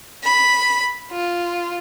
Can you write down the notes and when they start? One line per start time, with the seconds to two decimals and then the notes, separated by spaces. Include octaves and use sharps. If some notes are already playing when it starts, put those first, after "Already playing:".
0.25 B5
1.12 F4